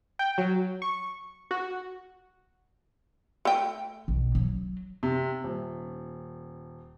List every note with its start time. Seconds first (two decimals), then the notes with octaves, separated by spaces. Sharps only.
0.19 G5
0.38 F#3
0.82 C#6
1.51 F#4
3.45 A3 G5
4.08 B1
4.35 F#3
5.03 C3
5.43 D#1